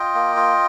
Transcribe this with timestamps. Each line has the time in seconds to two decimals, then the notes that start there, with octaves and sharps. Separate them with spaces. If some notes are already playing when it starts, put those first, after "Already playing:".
Already playing: F4 D#5 G5
0.15 A#3
0.36 F4